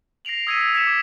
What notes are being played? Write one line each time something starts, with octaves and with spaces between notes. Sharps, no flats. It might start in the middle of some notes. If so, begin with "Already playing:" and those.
A#6 C7 D7 F7 F#7
D#6 E6 G#6 B6 C#7 D#7
F7
G#6 B6 C#7 E7
D6